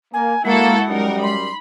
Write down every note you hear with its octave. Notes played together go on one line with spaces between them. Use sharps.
A#3 G#5
G#3 A#3 E4 F#4 A4 F#5
F#2 G3 D#4 A#4
B5 C6